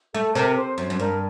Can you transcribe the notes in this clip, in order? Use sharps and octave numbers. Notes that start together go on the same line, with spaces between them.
A3 A4
C3 A#4
C5
F#2 C5
F#2
G2 A#4